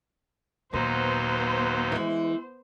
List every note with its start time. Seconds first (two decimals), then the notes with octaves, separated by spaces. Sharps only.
0.73 D#2 A#2 F#3 B3 D#4 C5
1.92 E3 G#3